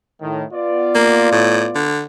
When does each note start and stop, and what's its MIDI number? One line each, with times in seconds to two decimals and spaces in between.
0.22 0.44 45
0.22 0.44 51
0.53 1.87 59
0.53 1.87 65
0.53 1.87 74
0.95 1.28 58
1.32 1.67 45
1.75 2.03 50